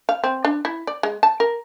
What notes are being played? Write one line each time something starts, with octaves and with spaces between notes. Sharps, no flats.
F5
C4
D4
E4
D5
G#3
A5
A#4